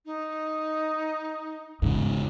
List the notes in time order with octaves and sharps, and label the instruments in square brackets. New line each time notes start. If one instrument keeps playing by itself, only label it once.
[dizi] D#4
[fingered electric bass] E2 C#3 [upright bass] G#2